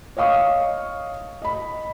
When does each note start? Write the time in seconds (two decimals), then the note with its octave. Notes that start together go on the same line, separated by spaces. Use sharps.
0.17 C#5 D#5 F5 C#6 D#6
1.42 D#5 B5